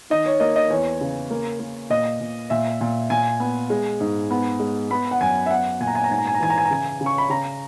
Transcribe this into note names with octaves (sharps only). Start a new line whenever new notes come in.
D#3 D#5
C#5
A#3 D#5
D#5
E2 C#5
C#3
A#3
A#3
A#2 D#5
A#2
A#2 E5
A#2
A#2 G#5
B3
G#3
G#2
B3
G#3
B3 B5
F#5
F#2 G#5
E5
B3 F#5
A#2 G#5
A#5
G#5
A#5
G#2 G#5
A#5
G#5
A#5
E3 G#5
A#5
G#5
A#5
C#3 G#5
C#3
C#6
B5
C#3 A#5